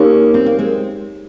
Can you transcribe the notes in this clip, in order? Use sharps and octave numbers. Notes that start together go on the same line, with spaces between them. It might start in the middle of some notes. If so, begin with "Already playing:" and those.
Already playing: A#3 C#4 D#4 G4 C#5
C4
A#3
G#3 C4